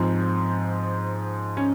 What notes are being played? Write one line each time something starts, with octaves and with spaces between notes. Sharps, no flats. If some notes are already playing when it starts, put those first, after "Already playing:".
Already playing: G#2 F3 C4
C#4